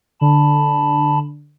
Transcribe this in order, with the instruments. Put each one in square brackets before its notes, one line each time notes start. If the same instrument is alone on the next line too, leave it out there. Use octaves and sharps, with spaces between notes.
[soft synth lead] D3 [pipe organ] A5 B5